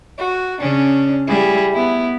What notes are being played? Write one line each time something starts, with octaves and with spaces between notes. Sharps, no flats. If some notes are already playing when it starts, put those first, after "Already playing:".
F#4
C#3 C#4 D4
G3 E4 G#4
B3 E4